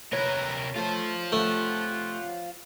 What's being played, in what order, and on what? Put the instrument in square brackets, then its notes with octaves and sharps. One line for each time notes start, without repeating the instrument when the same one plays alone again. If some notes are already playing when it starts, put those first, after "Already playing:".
[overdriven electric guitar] C3 A#4 [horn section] B4 [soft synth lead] C#5
[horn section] A3 [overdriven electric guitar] F4 C5
[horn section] C3 G4 F#5 [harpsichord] A3